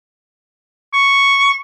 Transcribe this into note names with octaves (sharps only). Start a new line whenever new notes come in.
C#6